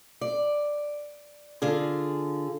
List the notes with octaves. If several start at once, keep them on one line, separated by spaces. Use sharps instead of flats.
D5
D3 F4 G#4